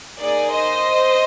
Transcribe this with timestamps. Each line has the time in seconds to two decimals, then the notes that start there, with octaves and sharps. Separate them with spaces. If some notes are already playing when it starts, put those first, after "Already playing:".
0.20 A#3 D#4 G#4 D5
0.53 C5 D#5